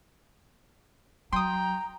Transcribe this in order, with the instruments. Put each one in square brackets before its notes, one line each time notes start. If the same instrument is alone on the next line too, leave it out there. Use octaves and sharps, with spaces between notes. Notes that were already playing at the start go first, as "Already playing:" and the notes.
[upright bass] F#3 [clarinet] G5 [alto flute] A#5 [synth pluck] C6 D#6